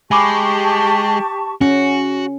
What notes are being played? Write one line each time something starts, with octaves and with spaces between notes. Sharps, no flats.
G#3 G4 G#5 A5 B5 C#6 D6
C#4 F#4